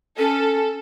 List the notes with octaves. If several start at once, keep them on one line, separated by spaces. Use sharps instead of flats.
C#4 A4